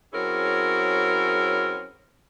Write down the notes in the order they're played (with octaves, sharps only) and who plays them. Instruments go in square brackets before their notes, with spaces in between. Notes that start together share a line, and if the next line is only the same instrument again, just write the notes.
[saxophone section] F#3 C4 C#4 E4 G#4 A#4